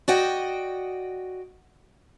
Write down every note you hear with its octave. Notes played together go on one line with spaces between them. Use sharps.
F#4 D5 D#5 F#5 G5